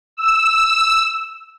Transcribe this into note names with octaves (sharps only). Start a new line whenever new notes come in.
E6